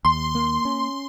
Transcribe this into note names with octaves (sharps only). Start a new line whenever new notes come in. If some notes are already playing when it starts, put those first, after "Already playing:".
D#2 C6
A#3
C#4